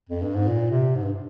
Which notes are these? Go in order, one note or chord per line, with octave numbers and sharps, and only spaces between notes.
F2
G2
G#2
A#2
C3
G#2
G2